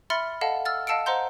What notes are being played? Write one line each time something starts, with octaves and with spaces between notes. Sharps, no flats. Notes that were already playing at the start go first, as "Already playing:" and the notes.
E5 B5 C6 F6 A6 C#7
A4 D#5 F5 F#5 A5
E6 F6 A6
D#5 F5 A5 E6 C#7 D7
C5 D#5 F#5 A#5 C6 G6